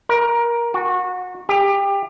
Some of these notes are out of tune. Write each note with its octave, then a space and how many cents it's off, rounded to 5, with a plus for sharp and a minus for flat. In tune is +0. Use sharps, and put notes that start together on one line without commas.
A#4 +15
F#4 -25
G4 +25